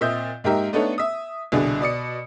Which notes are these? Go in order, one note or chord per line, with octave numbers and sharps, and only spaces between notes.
A#2 C4 D#5 E5 G6
G#2 A#3 D#4 G4 A#4 E5
A3 B3 D4 D#4 A4 C#5
E5 D#6
C2 B2 D3 D4 G#4
B2 D5 D#6 C#7